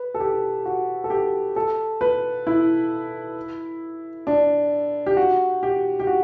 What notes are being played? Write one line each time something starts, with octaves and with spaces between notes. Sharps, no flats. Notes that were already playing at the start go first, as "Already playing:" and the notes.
Already playing: B4
A4
G4
F#4
A4
G4
A4
B4
E4
D4
G4
F#4
G4
G4
F#4